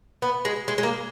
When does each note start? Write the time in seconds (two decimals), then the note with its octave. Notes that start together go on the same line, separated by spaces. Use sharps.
0.22 B3
0.45 G#3
0.68 G#3
0.78 G#3
0.83 A#3